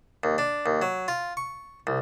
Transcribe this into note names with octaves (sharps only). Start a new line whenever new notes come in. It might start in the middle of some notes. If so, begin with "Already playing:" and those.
D#2
D4
D#2
F#3
F4
C#6
C2